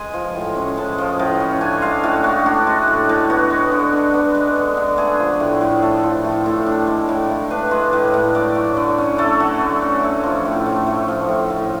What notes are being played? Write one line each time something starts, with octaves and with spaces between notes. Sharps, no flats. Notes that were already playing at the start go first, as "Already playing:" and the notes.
Already playing: G#3 G#5
F3
A2
C#4
G#3 A5
F3
A2
C#4
D4 G#5
G#3 F5
A2 F#4
A2 F#4
D4 F#4
G#3
A2
A2
B3 F#4
G#3
D3
D3
B3
G#3
D3
D3
A3 G#4
F3
A2
A2
A3 A4
F3
A2
A2
D4
G#3
A2
A2
D4 B4
G#3
A2
A2
A3 D5
F#3
D3
C#4
A3 A4
F#3
D3
C#4
A3
F3
A2
A2
A3
F3
A2
A2